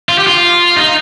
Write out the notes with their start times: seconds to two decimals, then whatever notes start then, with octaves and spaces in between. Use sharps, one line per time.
0.09 F4
0.18 G4
0.27 F4
0.76 D#4